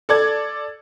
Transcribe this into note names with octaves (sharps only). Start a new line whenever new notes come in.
A4 D5 G#6